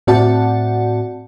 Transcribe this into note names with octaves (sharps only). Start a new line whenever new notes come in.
A2 C4 F#4 D5 F#5 A5